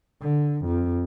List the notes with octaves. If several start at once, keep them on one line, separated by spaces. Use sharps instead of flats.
D3
F2